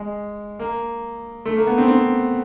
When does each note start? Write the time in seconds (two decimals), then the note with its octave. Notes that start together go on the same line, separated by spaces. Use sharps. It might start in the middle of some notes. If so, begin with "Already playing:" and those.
Already playing: G#3
0.59 A#3
1.46 A3
1.56 A#3
1.67 B3
1.78 C4
1.88 C4